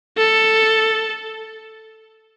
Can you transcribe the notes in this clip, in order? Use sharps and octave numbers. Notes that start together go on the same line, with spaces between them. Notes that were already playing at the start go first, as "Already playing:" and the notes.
A4